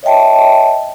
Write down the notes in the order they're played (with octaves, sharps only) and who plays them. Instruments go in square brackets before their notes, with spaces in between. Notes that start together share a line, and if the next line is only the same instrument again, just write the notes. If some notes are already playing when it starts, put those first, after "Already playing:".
[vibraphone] C#5 D#5 E5 G5 A5